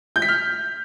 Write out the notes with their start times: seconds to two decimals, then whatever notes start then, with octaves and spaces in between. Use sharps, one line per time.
0.16 G6
0.22 B6
0.28 F6